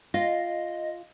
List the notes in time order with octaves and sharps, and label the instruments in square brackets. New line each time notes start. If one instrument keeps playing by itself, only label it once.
[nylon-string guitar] F4 [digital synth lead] D#5